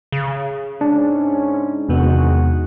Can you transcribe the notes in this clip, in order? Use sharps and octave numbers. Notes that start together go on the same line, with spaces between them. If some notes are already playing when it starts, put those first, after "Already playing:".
C#3
G#2 C#4 D4
E2 C3 D#3 G#3 B3 F#4